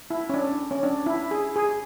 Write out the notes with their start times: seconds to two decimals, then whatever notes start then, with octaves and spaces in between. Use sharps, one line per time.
0.10 E4
0.29 C#4
0.34 D4
0.71 C#4
0.83 D4
1.06 E4
1.31 G#4
1.56 G#4